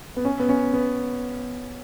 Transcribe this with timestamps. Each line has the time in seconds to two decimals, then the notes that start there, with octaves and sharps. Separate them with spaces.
0.16 B3
0.25 C#4
0.40 B3
0.49 C#4
0.73 B3